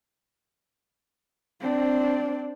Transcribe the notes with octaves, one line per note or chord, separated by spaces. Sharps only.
C4 D4